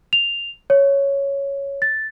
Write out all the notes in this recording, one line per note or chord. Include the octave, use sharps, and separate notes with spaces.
F7
C#5
A6